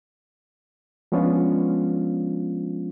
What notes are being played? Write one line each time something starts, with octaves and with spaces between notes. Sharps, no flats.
F3 G#3 B3 C#4 D4 F4